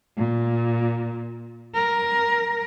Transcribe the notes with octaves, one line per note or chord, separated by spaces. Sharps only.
A#2
A#4